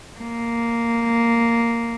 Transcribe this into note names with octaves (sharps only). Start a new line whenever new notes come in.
A#3